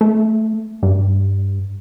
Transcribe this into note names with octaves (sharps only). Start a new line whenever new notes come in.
A3
G2